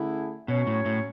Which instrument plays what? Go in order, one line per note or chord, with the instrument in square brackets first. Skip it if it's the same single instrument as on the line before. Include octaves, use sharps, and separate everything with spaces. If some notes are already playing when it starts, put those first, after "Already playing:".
Already playing: [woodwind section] D3 A3 C#4 E4 G#4
[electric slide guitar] B2 [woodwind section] F#3 C#4 F#4 C#5
[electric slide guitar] A2
A2